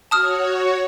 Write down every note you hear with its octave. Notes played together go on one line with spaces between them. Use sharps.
F#4 C#5 A5 D#6 F6